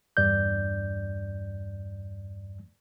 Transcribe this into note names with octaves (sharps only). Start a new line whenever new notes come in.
E2 G2 D5 G6